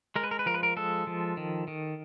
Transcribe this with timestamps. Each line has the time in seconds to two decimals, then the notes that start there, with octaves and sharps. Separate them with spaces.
0.16 G#3 A#4
0.24 B4
0.31 A#4
0.39 B4
0.46 F3 A#4
0.54 B4
0.63 A#4
0.77 G#3 A4
1.07 F3
1.37 D#3
1.68 D#3